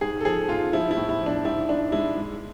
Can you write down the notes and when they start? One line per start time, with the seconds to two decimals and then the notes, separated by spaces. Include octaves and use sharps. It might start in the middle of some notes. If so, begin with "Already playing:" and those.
0.01 G#2 G#4
0.21 A4
0.25 F3 G#4
0.48 G#2 F4
0.73 F3 E4
0.91 E4
0.97 A2
1.09 E4
1.21 F3
1.26 D4
1.45 G#2 E4
1.69 G#2 D4
1.92 G#3 E4
2.16 G#3